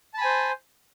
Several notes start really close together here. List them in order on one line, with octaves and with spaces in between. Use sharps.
A5 B5 G#5 C5